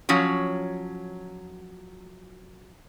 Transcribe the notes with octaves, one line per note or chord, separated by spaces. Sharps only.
F3 F#3 C#4 C#5